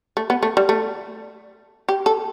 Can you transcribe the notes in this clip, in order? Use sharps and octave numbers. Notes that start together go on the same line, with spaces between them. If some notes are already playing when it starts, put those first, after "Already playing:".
A3
B3
A3
G3
A3
G4
A4